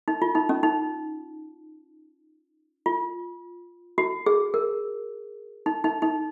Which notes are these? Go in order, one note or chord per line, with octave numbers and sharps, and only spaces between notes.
D#4
F4
D#4
C#4
D#4
F4
F#4
G#4
A#4
D#4
D#4
D#4